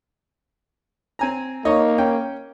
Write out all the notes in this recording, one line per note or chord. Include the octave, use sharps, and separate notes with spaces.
C4 G#5 A#5
A#3 D#4 C#5 D#5
C#4 G5